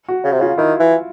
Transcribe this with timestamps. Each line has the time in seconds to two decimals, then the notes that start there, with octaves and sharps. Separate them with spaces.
0.08 F#4
0.24 C#3
0.32 C3
0.40 C#3 F4
0.58 D#3 E4
0.80 E3